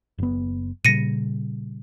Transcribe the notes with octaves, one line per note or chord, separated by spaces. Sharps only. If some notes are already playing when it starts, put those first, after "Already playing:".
F#1 B3
A#2 C#3 G3 A#6 C#7 D#7